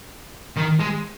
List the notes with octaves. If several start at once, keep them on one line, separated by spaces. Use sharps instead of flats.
D#3
G#3